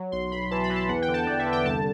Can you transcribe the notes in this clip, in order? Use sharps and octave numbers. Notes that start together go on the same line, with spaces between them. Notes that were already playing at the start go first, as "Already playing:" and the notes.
Already playing: F#3
B1 C6
B1 B5
E3 A5
B5
E3
A5
E2 F#5
G5
D3
A5
E2 D5
E5
D3
G5
C2 A5